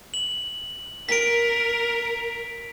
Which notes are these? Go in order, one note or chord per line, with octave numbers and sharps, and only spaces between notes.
F#7
A#4 B6 D7